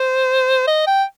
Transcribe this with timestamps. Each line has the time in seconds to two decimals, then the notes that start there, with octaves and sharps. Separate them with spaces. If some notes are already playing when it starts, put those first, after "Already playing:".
Already playing: C5
0.67 D#5
0.87 G5